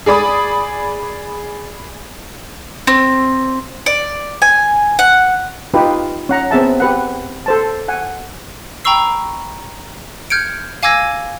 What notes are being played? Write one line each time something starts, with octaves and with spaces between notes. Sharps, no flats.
G#4 D5 B5 D#6
C4
D5
G#5
F#5
D#4 F4 G4 B4
C#4 F#5 A#5
B3 C4 G#4 E5 A5
G4 B4 F#5
A4 C5 A5
F#5 G#5
G5 A#5 B5 C#6 E6 C7
F6 G6 G#6 C#7 D7
F5 G#5 D6 E6 G#6 A#6